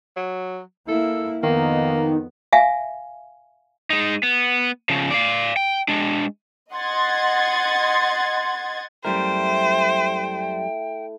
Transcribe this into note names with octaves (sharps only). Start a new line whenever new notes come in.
F#3
A#3 E4 A4
F2 D#3 A#3 B3
E5 F5 G#5
G#3 D#4
B3
C#3 F3
D5 F5
G5
G#3 D4
D#5 F#5 C6 G#6 A6
F#2 G3 A3 E4 A#4 C5 G5 C#6